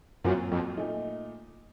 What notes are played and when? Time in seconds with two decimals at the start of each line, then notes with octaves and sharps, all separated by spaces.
0.24 F#2 A#2 F#3 C4 F4
0.52 F2
0.78 A#2 A3 D#4